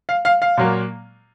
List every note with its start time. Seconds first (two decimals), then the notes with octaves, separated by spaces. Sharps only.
0.09 F5
0.25 F5
0.42 F5
0.57 A#2 F#3 A#3